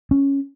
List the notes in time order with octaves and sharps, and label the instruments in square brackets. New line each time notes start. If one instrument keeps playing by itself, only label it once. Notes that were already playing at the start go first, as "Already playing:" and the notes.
[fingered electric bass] C#4